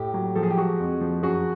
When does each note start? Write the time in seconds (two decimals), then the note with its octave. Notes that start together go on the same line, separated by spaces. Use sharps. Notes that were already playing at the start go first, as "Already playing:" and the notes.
Already playing: A2 G4
0.14 F#3
0.35 F3 A4
0.43 G#4
0.50 G4
0.57 G#3 F#4 G#4
0.80 F2
1.01 F3
1.22 F#2 F#4 G#4